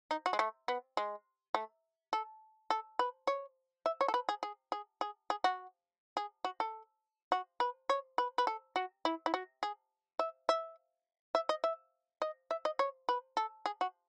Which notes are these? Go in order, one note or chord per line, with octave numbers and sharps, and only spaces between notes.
D#4
F#4
G#3
A3
B3
G#3
A3
A4
A4
B4
C#5
E5
C#5
A4
B4
G#4
G#4
G#4
G#4
G#4
F#4
G#4
F#4
A4
F#4
B4
C#5
B4
B4
A4
F#4
E4
E4
F#4
G#4
E5
E5
E5
D#5
E5
D#5
E5
D#5
C#5
B4
A4
G#4
F#4